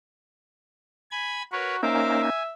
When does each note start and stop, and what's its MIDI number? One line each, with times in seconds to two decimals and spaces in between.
1.11 1.42 80
1.11 1.42 83
1.11 1.42 92
1.52 1.81 66
1.52 1.76 70
1.52 1.76 71
1.52 1.76 73
1.83 2.30 58
1.83 2.30 61
1.83 2.30 63
1.83 2.21 70
1.83 2.21 72
1.83 2.54 76
1.83 2.21 86
2.22 2.43 80